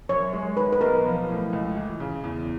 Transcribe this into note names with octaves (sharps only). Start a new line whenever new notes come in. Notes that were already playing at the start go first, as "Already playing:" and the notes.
F#2 C#5
G#3
D#3 B4
B4
B1 A#4
F3
A2
C#2
E3
C#3
E2